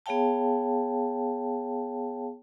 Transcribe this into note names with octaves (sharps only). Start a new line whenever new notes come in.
B3 G#4 C#5 F5 G5 A5